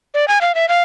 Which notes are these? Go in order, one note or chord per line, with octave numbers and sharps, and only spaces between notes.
D5
G#5
F5
E5
F5